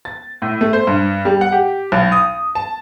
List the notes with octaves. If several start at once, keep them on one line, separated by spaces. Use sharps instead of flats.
A6
A2
A3
C5
G2
G3
F#5
G4
B1
D#6
A5